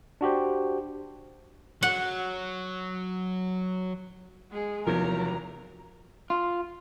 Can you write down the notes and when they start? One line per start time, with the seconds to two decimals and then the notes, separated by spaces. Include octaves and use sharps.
0.21 D4 F#4 G4 C5
1.83 F#3 F#5
4.51 G#3 G#4
4.87 E2 C3 F3 F#3 A#4 A#5 G#6
6.30 F4